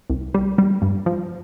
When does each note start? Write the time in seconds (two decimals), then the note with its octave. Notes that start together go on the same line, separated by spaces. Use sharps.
0.10 C2
0.34 G3
0.58 G3
0.82 G2
1.06 F3